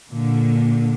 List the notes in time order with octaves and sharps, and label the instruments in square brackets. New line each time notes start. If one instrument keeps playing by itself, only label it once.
[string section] A#2 D3